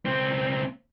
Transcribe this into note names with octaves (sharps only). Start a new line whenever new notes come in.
C#2 C4